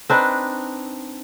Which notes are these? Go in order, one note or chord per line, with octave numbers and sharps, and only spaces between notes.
C4 D4 D#4 B4